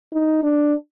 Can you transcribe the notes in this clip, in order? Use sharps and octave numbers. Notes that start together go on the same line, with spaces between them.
D#4
D4